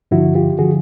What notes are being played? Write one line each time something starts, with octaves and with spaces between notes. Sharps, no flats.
G2 D3 F3 E4 F#4
F4 G4
D3 F3 F#4 G#4